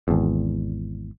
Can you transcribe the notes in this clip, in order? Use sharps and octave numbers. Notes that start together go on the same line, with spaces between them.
G#1 E2